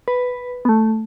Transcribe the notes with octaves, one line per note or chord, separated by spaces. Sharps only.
B4
B3
A3